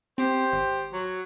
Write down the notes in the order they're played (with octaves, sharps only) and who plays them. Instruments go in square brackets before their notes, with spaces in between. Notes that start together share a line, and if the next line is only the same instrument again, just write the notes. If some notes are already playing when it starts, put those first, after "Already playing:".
[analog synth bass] C4 [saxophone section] G4 C5
[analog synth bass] G#1
[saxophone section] F#3